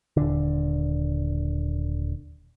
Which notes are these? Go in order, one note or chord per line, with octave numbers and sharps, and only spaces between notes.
D#1 D3